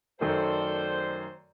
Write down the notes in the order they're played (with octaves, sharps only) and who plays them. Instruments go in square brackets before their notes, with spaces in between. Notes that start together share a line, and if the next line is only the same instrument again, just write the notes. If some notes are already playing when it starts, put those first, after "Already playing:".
[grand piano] F#2 D#3 A3 [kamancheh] A4 D5 [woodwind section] C5